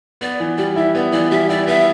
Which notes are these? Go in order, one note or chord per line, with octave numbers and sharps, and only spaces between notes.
B3 D5
E3
G3 D5
E4 E5
B3 D5
E3 D5
G3 E5
E4 D5
B3 E5